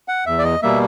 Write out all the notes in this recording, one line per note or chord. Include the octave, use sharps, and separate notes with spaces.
F#5
E2 E5
D5
D#5
B2 G3 A#3 E5